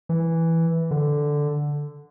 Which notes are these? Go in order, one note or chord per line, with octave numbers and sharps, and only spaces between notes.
E3
D3